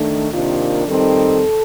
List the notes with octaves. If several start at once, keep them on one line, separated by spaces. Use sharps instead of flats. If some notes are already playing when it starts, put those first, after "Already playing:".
Already playing: D#3 A3 D4
C3 D#3 A#3 D4 F4
F2 D#3 G3 C4 D#4 A4